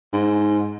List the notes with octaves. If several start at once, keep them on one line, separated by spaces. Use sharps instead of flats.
G#2